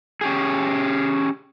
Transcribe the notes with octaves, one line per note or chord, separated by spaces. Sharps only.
C#4 G4 G#4